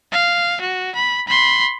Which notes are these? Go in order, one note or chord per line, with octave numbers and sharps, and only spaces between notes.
F5
F#4
B5
B5 C6